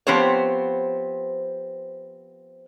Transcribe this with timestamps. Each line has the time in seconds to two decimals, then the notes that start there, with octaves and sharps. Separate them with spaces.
0.07 F3 B3 C4 G4 C5 C#5